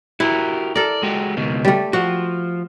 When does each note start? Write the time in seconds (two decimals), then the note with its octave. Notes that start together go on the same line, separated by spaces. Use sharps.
0.20 E4 F#4 G4 A#4
0.76 A4 A#4 D5
1.03 G#3 F#4 G4
1.37 C#2 B2 D#3
1.65 G3 A3
1.93 F3 F#4